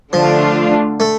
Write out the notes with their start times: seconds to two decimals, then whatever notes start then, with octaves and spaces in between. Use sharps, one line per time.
0.13 D3 F3 A3 D4 F4
1.00 A3